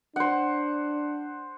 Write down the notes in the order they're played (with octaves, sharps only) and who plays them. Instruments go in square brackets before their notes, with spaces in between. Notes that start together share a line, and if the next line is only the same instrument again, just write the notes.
[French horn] D4 [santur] C5 F#5